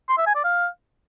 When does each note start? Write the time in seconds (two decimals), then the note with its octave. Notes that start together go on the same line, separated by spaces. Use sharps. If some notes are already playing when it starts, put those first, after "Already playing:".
0.09 C6
0.18 E5
0.26 G#5
0.35 D5
0.44 F5